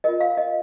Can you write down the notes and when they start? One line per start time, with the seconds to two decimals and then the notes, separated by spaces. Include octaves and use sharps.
0.04 F4 A#4 D#5
0.21 F5
0.38 D#5